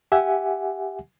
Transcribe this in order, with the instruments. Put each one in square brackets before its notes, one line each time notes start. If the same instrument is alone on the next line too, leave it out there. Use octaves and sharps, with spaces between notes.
[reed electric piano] G4 E5 F#5 G#5